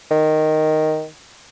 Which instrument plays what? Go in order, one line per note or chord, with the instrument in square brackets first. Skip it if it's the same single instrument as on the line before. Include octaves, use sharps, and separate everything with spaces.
[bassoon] D#3